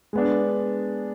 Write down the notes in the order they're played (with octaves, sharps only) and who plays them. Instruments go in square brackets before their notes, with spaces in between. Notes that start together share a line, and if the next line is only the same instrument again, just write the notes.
[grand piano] G#3 B3 D4